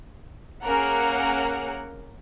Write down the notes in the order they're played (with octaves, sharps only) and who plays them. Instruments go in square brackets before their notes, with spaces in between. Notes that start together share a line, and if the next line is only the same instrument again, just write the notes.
[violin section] A#3 C#4 G#4 A#4 F#5